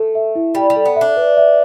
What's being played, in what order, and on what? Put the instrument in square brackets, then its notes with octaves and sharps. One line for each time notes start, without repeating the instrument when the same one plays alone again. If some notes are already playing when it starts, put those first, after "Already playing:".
Already playing: [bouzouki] A3 [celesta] A4
[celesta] E5
E4
[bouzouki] G3 [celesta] G5
[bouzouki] G3
[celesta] A4
[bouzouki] B3
[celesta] E5
[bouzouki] D4
[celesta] B4
E5